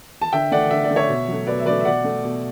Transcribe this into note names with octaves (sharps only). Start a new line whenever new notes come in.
A5
D3 E5 G5
A3 D5 F#5
D3 E5
D5
A3
C#5 E5
B2
F#3 A3
B2 B4 D5
E5
F#3 A3 B4 D5
E5
B2 D5 F#5
A3
B2